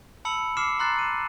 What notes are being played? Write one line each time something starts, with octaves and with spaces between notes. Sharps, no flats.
A5 B5 E6 C#7 F#7
D6 F6 C7 C#7 E7
A#5 C6 F6 F#6 A6 C7
D#7